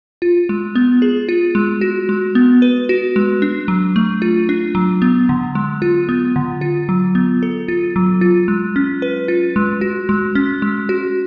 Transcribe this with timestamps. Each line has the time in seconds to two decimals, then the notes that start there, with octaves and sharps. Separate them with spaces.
0.22 F4
0.49 G#3
0.75 B3
1.02 G#4
1.29 F4
1.55 G#3
1.81 F#4
2.09 G#3
2.35 B3
2.62 B4
2.89 F#4
3.16 G#3
3.42 D4
3.68 F#3
3.96 A3
4.22 F4
4.49 D4
4.75 F#3
5.02 B3
5.29 D3
5.55 G#3
5.82 F4
6.09 B3
6.36 D3
6.61 F4
6.89 F#3
7.15 B3
7.43 A4
7.68 F4
7.96 F#3
8.21 F4
8.48 G#3
8.76 C#4
9.02 B4
9.28 F4
9.56 G#3
9.81 F#4
10.09 G#3
10.35 C#4
10.62 G#3
10.89 F#4